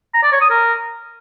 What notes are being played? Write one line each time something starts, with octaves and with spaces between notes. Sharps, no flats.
A#5
D5
C#5
D#6
A#4